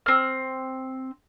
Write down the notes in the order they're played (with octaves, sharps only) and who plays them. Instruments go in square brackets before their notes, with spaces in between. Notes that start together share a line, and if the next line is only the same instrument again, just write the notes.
[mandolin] C4 F6